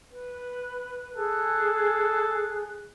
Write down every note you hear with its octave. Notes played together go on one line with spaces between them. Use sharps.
B4
G#4 A4 G#5 F#6